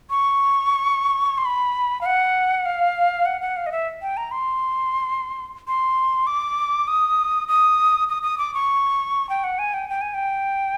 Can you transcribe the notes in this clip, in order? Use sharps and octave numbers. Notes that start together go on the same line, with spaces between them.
C#6
C6
B5
F5
F#5
F5
F#5
F#5
F5
D#5
E5
G5
A#5
C6
C6
D6
D#6
D#6
D#6
D#6
D6
C#6
G5
F#5
G#5
G5
G5
G#5
G5